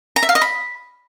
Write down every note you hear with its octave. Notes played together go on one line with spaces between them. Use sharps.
A#5
E5
F5
D#5
B5